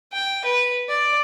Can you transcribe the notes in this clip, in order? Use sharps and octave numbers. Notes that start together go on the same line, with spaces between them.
G5
B4
D5